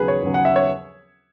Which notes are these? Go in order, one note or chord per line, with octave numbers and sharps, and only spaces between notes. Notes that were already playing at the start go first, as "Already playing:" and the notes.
Already playing: D#2 C#3 F#3 B3 G#4 B4
C#5
D#2 C#3 F#3 B3
F#5
E5
C#5